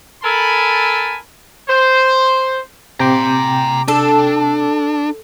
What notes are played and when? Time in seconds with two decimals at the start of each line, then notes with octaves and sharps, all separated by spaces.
0.23 A4 A#4 G#5 A5 B5
1.68 C5
3.00 C3 G5 A#5 C6 D6
3.88 D4 A4